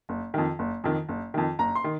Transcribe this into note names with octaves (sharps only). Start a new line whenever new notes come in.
F#1
F2 D#3
F#1
F2 D#3
F#1
F2 D#3
F#1 A#5
C6
D#3